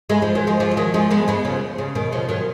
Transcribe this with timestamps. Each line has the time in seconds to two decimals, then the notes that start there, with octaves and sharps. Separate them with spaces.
0.10 G#3 B3
0.22 F3 G#3
0.35 D#3 F#3
0.47 F3 G#3
0.60 F3 G#3
0.71 G#3
0.77 D#3 F#3
0.94 F3 G#3
1.11 G#3 B3
1.28 G#3 B3
1.45 C#3 F3
1.78 C#3
1.95 B2 D#3
2.12 C#3 F3
2.29 D#3 F#3